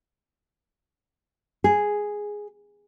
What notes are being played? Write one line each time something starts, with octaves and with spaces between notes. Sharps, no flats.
G#4